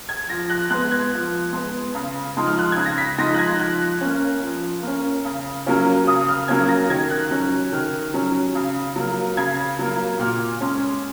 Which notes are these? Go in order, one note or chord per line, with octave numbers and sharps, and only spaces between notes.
G#6
F3 A#6
F#6
G#3 B3 F#6
G#6
F3
G#3 B3
C#3
F3 G#3 D#4
F6
F#6
C#3 G#6
A#6
B6
F3 G#3 D#4 A#6
F#6
G#6
F3 F#6
A#3 C#4
F3
A#3 C#4
C#3
F#3 A#3 C#4
C#3 D#6
F6
F#3 A#3 C#4 G#6
A#6
D#3 G#6
F#6
F#3 C#4
D#3 F6
F#3 C#4
C#3
F#3 A#3
C#3 G#6
F#3 A#3
A#2 F6
G#3 C#4